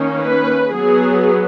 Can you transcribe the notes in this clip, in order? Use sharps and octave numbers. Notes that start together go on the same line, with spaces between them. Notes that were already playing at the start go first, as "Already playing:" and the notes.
Already playing: D#3 A#3 C#4
B4
F#3 B3 G#4